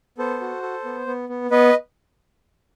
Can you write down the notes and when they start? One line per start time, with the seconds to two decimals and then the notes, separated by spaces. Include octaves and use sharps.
0.18 B3 A4 C5
0.41 F#4
0.63 A4
0.85 B3
1.07 B3
1.29 B3
1.51 B3 B4 D#5